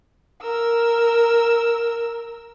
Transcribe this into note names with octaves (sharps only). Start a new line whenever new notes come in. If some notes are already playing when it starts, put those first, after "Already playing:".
A#4 E6